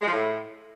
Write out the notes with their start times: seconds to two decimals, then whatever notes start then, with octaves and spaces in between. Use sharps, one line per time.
0.01 G#3
0.07 F3
0.12 A2